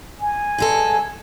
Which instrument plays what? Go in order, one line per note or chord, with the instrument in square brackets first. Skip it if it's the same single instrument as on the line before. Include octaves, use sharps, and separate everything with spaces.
[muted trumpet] G#5
[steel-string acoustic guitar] G2 G#3 A4